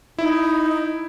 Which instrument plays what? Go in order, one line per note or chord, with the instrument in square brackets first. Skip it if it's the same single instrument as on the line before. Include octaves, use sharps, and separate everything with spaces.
[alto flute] D#4 [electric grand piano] E4